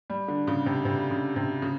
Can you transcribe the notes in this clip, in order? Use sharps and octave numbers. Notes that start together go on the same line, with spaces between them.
G3
D3
C#3
C3
C3
C#3
C3
C#3